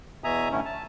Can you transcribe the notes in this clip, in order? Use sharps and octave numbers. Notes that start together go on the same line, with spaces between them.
E2 B2 E5 G#5 A#5 D#6
A2 D3 A3 C#4 E4
A5